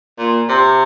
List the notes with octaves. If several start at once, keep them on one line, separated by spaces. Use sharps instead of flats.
A#2
C3